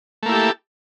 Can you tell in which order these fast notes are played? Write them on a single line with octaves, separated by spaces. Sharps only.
A3 A#3 E4 G4 A4